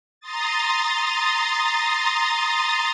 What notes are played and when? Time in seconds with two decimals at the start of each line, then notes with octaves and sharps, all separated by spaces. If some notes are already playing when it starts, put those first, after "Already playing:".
0.20 A#5 C6 D#6 A6